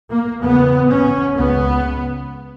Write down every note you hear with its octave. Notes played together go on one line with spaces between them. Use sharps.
A#3
E2 C#3 B3
C#4
C#2 C#3 B3